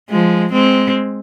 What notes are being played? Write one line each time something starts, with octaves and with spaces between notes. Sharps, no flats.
F3 G#3
G#3 C4